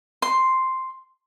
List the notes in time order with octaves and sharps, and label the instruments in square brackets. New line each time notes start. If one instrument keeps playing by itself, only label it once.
[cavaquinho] C6